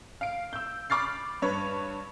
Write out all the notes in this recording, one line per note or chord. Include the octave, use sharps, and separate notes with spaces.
F5 D7
E6 G6
B5 D6 F6 A6 C7
G2 B4 C#5